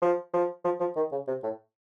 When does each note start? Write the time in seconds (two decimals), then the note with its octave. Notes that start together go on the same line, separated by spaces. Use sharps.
0.02 F3
0.33 F3
0.64 F3
0.80 F3
0.96 D#3
1.12 C#3
1.27 C3
1.43 A2